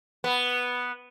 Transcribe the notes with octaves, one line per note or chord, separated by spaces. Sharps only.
B3